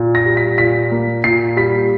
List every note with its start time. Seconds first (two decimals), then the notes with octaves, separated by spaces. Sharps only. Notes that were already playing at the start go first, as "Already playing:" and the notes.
Already playing: A#2
0.15 A#6
0.26 G3
0.37 B6
0.58 A#2 B6
0.92 A#3
1.24 A#2 C7
1.57 G3 B6